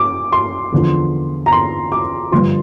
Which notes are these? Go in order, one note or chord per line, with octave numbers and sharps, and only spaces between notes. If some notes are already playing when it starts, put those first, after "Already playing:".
Already playing: D6
C6
E2 D3 F3
A#5
C6
D6
G2 D3 F3 C6